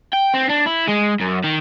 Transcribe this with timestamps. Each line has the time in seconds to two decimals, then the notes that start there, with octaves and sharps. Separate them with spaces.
0.13 G5
0.34 C4
0.49 D4
0.66 E4
0.88 G#3
1.20 F#2
1.44 D#3